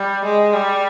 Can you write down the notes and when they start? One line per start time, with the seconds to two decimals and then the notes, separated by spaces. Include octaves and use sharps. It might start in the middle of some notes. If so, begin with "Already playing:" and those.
Already playing: G3
0.24 G#3
0.54 G3